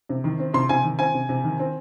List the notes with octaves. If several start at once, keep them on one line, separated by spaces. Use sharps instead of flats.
C3
D#3
C4
C3 C6
C3 G#5
D#3
C4 G#5
C3
C3
D#3
C4